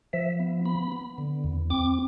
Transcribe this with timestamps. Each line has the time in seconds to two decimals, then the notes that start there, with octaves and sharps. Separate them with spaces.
0.13 F3 E5
0.40 B3
0.65 B3 B5
0.92 B3
1.18 D3
1.44 E2
1.70 C4 D6